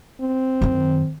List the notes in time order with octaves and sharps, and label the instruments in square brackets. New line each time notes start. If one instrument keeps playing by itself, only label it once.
[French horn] C4
[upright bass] F#2 D#3